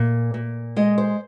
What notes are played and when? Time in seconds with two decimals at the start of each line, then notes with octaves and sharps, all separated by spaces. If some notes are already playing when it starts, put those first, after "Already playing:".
Already playing: A#2
0.34 A#2
0.76 G#3 D#5
0.98 C5